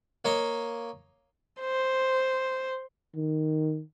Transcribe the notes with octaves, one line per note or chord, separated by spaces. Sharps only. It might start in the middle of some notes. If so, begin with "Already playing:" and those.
A#3 C#5 D#5
C5
D#3